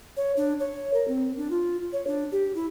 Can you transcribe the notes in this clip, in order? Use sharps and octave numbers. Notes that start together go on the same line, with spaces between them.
C#5
D4
C#5
A#4
C4
D4
F4
C#5
D4
G4
E4